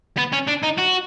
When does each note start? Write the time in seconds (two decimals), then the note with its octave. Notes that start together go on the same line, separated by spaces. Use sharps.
0.18 B3
0.33 C#4
0.48 D4
0.63 D#4
0.78 F#4